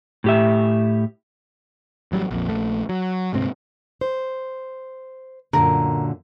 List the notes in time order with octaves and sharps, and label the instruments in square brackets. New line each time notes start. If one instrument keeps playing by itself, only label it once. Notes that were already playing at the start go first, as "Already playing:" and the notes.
[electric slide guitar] A2 G4 E5
[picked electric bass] A1 F#3 G3
A#1 F2
A#1 A3
F#3
D2 G#2 C3 C4
[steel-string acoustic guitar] C5
[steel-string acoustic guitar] F#2 A#2 D3 [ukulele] A#4